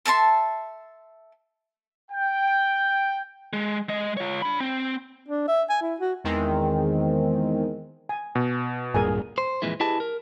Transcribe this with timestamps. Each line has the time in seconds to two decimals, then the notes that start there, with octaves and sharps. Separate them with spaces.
0.05 A4 E5 A5 C6
2.11 G5
3.53 G#3
3.89 G#3 D#5
4.17 F4 C#5
4.42 D4 B5
4.60 C4
5.28 D4
5.48 E5
5.69 G#5
5.82 E4
6.00 F#4
6.24 E2 D#3 G#3 C4
8.09 G#5
8.35 B2
8.94 D1 G2 A#2 G#4 A#4 G#5
9.38 C5
9.62 F2 A#2 E3 G#3 E4
9.80 E4 G4 G#4 B4 D#5 A5
10.00 A#4